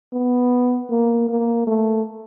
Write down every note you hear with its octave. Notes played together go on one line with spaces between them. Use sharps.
B3
A#3
A#3
A3